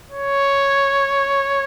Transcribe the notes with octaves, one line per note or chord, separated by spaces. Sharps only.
C#5